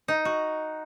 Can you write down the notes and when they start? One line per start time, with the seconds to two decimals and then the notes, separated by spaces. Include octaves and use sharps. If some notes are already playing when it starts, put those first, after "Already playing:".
0.08 D#4
0.25 F#4